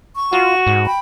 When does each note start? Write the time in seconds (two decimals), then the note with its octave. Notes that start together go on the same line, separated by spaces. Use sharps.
0.15 C#6
0.33 F4 F#4
0.67 G#2
0.85 G5 B5